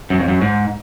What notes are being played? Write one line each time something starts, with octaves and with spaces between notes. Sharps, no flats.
F#2
F2
F#2
G#2